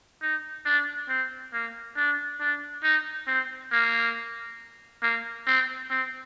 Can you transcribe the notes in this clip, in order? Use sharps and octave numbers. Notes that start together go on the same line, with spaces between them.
D#4
D4
C4
A#3
D4
D4
D#4
C4
A#3
A#3
C4
C4